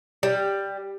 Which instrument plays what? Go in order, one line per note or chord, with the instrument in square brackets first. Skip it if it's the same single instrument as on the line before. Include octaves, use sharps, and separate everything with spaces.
[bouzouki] G3